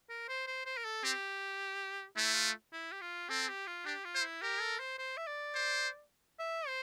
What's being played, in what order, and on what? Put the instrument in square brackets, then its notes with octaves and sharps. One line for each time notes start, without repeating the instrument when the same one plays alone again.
[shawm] A#4
C5
C5
C5
A#4
A4
[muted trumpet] C4 [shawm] G4
[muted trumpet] A3 [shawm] E4
[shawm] F4
E4
G4
F4
[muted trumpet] C4 [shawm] A4
[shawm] G4
F4
[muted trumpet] D4 [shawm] G4
[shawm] F4
[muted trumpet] C5
[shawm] E4
[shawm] G4 [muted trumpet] A#4
[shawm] A4
C5
C5
E5
D5
[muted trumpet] C5
[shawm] E5
C5